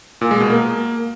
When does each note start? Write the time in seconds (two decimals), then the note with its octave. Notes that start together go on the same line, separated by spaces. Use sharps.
0.21 A#2
0.31 G#3
0.40 B2
0.50 A#3